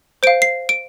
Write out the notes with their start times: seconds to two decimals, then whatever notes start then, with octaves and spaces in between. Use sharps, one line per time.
0.23 C5 F5 D7
0.42 C7
0.69 D7